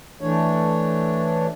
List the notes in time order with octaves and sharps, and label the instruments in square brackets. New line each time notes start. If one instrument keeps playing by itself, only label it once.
[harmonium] E3 A3 D4 C#5